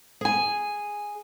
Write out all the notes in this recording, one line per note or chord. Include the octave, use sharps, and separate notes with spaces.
G#4 G#5